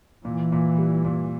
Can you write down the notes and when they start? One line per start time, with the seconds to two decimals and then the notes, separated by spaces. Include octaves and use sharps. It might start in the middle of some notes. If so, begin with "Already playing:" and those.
0.25 A#2 E3
0.52 A#2
0.78 G3
1.04 A#2